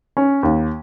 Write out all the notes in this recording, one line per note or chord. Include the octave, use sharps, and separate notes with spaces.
C#4
D#2